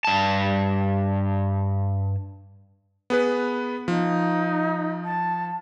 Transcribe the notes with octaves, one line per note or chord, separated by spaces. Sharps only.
G2 A5
B3 G#4 B4
F3 D#4
A5